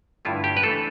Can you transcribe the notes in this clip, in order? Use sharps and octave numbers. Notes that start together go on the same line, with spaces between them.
G2 D3 A3 E4 F4
G4
B4
E3 A3 D4 F4 A4